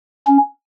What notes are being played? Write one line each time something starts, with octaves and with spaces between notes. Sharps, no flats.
C#4